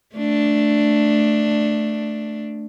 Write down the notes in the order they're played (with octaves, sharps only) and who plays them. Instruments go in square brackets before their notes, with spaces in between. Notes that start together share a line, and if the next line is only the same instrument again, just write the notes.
[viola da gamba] A3 D4